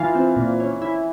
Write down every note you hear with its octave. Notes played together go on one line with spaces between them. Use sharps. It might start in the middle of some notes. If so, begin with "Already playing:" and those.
Already playing: E3 F4
C4
A#2
C#4
E4